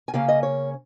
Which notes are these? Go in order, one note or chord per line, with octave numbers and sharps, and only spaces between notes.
G#5
C#3 A#3 C#4 F5
D#5
C#5